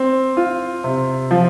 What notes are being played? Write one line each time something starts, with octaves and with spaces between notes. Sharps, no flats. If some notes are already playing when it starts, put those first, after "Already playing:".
Already playing: C4
F4
C3
F3